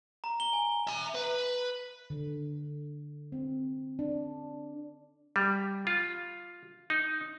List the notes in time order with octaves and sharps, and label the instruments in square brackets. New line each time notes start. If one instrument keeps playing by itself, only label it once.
[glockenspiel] A#5
G7
G#5
[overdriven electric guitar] E5 A#5
B4
[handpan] D3
C4
D4
[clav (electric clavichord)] G3
F4
D#4